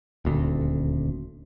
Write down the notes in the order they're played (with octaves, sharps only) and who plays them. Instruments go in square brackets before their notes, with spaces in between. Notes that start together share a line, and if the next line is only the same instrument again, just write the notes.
[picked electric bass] D#1 D2